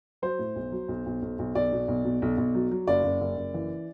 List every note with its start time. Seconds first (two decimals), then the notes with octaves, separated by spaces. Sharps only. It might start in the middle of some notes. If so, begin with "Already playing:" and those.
0.22 F#3 C5
0.39 A2
0.56 B1
0.72 F#3
0.88 B1
1.06 B1
1.22 B1
1.39 B1
1.55 B1 D5
1.72 B2
1.88 B1
2.05 B2
2.22 B1
2.38 B1
2.55 F#3
2.71 F#3
2.87 F#1 D5
3.04 F#1
3.21 F#1
3.37 F#1
3.54 E3